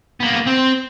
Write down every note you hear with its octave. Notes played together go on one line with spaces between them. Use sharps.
A#3 B3
C4